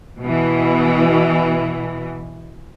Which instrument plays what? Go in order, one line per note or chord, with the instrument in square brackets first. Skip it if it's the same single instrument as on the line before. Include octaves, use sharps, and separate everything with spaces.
[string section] B2 E3